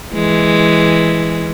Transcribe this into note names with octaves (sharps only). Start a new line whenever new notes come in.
E3 G#3